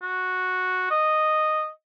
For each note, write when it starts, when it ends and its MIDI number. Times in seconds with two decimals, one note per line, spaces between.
0.02 0.88 66
0.91 1.69 75